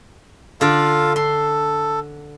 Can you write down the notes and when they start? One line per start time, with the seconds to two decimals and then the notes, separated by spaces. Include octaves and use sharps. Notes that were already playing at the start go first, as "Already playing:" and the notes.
0.61 D3 F4 A4 D5 F5
1.16 A4 C6